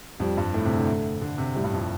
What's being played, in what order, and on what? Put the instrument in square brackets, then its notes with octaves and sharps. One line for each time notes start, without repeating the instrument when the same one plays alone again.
[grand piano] F2 [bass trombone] G3
[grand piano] G2
[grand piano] A2 [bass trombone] A3
[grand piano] C3
D3
D3
C3
[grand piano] A2 [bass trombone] G3
[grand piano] G2
F2